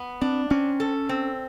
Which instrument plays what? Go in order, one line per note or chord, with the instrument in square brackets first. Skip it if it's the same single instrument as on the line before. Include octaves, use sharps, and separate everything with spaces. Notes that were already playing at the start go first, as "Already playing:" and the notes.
Already playing: [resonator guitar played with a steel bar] B3
[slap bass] C4 [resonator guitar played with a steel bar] D4
[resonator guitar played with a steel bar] C4 [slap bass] C#4
[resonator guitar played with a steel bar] A4
C4